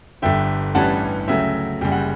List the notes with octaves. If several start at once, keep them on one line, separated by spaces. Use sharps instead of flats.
G1 G2 D3 E5 G5
A1 G2 E3 G3 C#4 F#5 A5
D2 C#3 F#3 A3 E5 G5
F#1 F#2 C#3 G3 G5
F#5